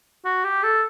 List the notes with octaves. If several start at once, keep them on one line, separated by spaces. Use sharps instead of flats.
F#4
G4
A4